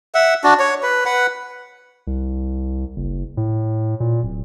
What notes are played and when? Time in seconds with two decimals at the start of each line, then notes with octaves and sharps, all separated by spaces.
0.15 E5 F#5
0.44 D4 F#4
0.59 C#5
0.83 B4
1.05 B4 F#5
2.07 C2
2.96 F#1
3.37 A2
4.00 A#2
4.23 D1